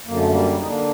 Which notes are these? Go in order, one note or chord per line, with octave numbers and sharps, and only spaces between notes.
F#2 D3 A#3
A3
G3 A#3
D#4
D3 A#3 D4